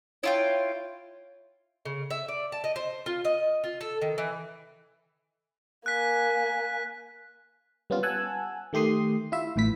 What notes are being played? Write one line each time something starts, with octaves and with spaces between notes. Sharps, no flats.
E4 F4 C#5 G5
C#3
E5
D5
A5
D#5
C5
F4
D#5
F4
A4
D#3
E3
A#3 G#5 F#6 B6
G3 B3 C#4 F4
F#5 G#5 A5 E6 F#6
D#3 A3 G4 C6 D#6 C7
E4 F4 E5
A1 A2 E3 E4 B6